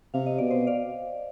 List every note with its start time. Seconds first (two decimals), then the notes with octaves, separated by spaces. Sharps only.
0.14 C3 F5
0.26 D#5
0.38 B2 D5
0.50 C5 D#5
0.67 D5 F5